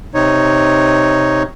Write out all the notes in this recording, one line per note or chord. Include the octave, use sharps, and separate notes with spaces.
C3 D#4 C#5